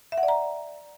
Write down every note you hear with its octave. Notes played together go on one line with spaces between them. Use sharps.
E5
F#5
D5
A#5